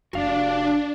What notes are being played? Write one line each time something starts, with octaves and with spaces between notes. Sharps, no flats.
F1 A#3 D4 F#4 F5